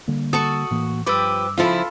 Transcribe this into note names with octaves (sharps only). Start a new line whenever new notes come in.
D3 G3 A#3
F#4 A4 A5 C#6 D#6
A2 E3 A#3
G2 F3 G4 B4 D6 E6
C#3 F3 E4 F4 A4 F5 B5